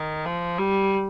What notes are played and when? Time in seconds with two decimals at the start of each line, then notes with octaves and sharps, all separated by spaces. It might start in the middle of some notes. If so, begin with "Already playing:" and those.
Already playing: D#3
0.25 F3
0.58 G3